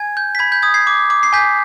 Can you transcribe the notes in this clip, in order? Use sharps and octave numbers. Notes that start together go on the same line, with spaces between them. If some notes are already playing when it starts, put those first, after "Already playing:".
Already playing: G#5 G#6
G6
B6
B5 G#6
G6
D#6 G#6
G#6 C7
D6
D6
C7
G#5 G6 B6